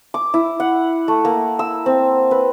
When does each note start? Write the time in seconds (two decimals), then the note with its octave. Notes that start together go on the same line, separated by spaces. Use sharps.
0.14 D6
0.34 E4
0.60 F#5
1.08 A3
1.25 A#3
1.59 E6
1.86 C4
2.31 B4